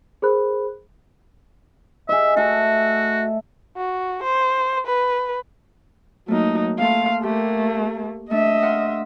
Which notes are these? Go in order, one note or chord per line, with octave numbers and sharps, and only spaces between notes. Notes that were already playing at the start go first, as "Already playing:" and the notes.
G#4 A#4 C5 B5 F#6
G#4 D#5 E5
A3 F#4 A4 E5
F#4
C5
B4
F#3 A3 A#3 D#4
A3 A#3 A4 F5 C6
A3 A#3 G4
A3 D4 D#5 E5
F5 F#5 C6